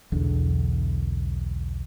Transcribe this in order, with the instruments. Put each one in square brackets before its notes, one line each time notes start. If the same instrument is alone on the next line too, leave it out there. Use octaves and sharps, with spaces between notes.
[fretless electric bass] B1 E2 D3